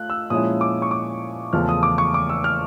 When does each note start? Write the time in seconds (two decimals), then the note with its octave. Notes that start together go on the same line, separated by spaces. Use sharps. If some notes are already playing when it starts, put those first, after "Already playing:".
Already playing: A3 F4 F#6
0.10 E6
0.30 A#2 F3 G#3 C#4 E4 D#6
0.61 D6
0.82 C#6
0.91 D6
1.53 E2 C#3 F3 A3 F6
1.69 D#6
1.83 D6
1.98 C#6
2.14 D6
2.29 E6
2.44 F6